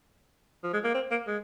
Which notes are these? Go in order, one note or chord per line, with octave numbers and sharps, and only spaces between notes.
F3
G#3
A#3
C4
A#3
G#3